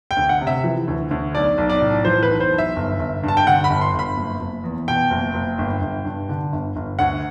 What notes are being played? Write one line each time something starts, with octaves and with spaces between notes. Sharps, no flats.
G5
D2
F#5
C3
E5
E3
D2
D2
B1 D5
B1
D5
A2
E3 C5
B4
B1
C5
B1
E5
G1
G1
G2
A5
G5
D3 F#5
B5
G1
C6
G1 B5
F#1
F#1
E2
B2 G5
F#1
F#1
G1
G1
G2
D3
G1
G1
D2 F#5